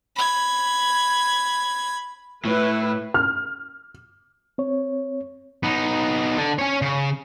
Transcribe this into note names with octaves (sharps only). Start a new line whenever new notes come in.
B5 G#6
A2 E4 B4
F6
C4 C#5
B3 D#4
D3
C#4 C#5
C#3